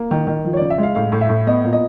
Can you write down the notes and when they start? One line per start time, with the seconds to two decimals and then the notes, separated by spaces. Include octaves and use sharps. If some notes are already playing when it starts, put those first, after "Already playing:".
Already playing: A#3
0.11 D#3
0.27 D#3
0.45 F3
0.53 C#5
0.57 C#3 D5
0.70 E5
0.78 G#3
0.83 F5
0.95 A2 F5
1.12 A2
1.21 E5
1.29 A2
1.47 B3 D#5
1.64 A#2
1.73 D#5